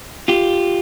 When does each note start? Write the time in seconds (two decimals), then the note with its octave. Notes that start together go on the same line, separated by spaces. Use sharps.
0.28 F4 G4